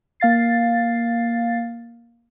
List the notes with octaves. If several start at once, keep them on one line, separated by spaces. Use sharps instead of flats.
A#3 F5 A6 C7